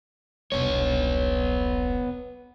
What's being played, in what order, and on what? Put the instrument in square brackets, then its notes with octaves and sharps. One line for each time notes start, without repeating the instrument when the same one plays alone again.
[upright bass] E1 C2 [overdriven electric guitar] B3 C#5